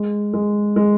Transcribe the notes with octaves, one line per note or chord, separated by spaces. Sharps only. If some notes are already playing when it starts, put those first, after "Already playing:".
Already playing: G#3
G#3
G#3